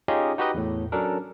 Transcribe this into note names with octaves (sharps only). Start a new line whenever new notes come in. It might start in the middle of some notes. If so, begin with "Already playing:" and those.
C#4 D#4 F4 G4 G#4 D#5
D#4 F#4 G4 B4 D#5
E2 A2
F#3 C#4 D4 A4 A#4